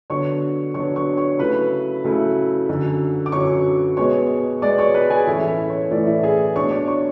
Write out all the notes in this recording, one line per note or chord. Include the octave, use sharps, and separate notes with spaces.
D3 F#3 B3 D4 C#5 C#6
D3 F#3 B3 D4 C#5 C#6
C#5 C#6
C#5 C#6
C#3 F#3 A3 E4 B4 B5
C#3 F#3 A3 E4
F#2 D3 F#3
D6
F#2 D3 F#3 C#5 C#6
B2 G#3 B3 C#5 C#6
B2 G#3 B3 D5 D6
C#5 C#6
B4 B5
G#4 G#5
A2 E3 A3 C#4 E4 E5
E4 E5
C#5
A2 E3 A3 C#4 E4 D5
E4 E5
G#4 G#5
B2 A3 D4 C#5 C#6
D5 D6
C#5 C#6